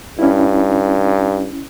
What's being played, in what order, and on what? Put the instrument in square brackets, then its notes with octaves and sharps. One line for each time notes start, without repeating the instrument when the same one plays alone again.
[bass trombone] G2 [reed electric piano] C#4 E4